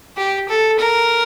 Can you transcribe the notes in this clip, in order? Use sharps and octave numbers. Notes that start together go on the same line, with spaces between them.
G4
A4
A#4